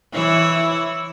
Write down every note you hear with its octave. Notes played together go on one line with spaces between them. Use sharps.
E3 E4 C#5